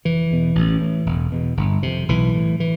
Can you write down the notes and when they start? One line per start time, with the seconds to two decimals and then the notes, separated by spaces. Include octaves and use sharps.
0.05 F1 E3
0.31 E2 B2
0.55 A1
0.81 A2
1.06 E1
1.32 E2 B2
1.57 G1
1.83 F2 C3
2.08 B1 E3
2.34 A2
2.60 E3